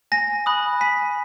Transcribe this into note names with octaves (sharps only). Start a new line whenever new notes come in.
G#5 A#6
B5 D#6 F#6
G#5 B6